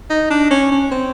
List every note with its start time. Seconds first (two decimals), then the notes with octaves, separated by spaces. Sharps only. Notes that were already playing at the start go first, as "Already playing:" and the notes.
0.10 D#4
0.30 D4
0.51 C#4
0.71 C#4
0.91 C4